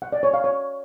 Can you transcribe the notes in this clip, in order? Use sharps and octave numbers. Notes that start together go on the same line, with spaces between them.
F#5
D5
C#5
F5
C#5